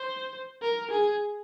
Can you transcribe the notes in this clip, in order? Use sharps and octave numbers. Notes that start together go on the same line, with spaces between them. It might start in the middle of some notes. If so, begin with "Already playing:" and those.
Already playing: C5
A#4
G#4